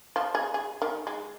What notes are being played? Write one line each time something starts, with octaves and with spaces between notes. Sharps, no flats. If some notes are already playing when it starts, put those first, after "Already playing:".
F3
G#4
G#4
D#3
G#3